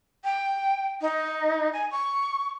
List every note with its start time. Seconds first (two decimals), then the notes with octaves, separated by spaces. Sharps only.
0.24 G5
1.02 D#4
1.73 G#5
1.91 C#6